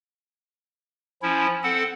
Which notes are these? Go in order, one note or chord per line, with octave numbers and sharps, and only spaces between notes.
F3 C#4 E4
C4 A4 F#5